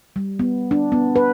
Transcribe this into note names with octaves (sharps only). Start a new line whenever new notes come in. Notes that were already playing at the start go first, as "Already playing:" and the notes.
G3
B3
D4
B3
B4